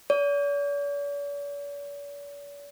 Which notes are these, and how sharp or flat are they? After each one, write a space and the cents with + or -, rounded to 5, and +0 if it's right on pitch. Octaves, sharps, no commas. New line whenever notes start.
D5 -45